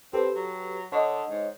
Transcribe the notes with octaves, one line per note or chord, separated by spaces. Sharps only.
C4 G4 A4 B4
F#3
D3 C#5 D#5
G#2